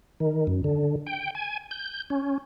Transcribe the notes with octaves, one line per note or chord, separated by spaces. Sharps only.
D#3
F#2
D3
G5
G#5
G6
C#4